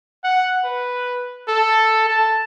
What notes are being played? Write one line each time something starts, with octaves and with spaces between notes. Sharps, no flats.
F#5
B4
A4
A5